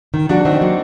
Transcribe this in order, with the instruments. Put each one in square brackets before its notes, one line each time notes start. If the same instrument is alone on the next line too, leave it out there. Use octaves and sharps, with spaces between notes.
[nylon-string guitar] D#3
[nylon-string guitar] F#3 A#3 [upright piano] D4 F#4
[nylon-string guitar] D#3 [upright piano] C4 D#4
[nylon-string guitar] F#3 A#3